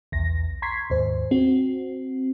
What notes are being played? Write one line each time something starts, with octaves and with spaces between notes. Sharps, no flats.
B1 E2 A#6
A#5 C6 C#6 G#6 B6 C7
D#2 G#2 C5
C4 F#4